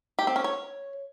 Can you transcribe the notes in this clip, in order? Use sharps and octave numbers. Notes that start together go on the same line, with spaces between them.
G4
C4
C#4
C#5